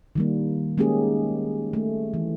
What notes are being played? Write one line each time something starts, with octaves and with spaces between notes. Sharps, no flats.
D#3 G3 A#3
G#3 A#3 C#4 D#4 G4 G#4
A3
E3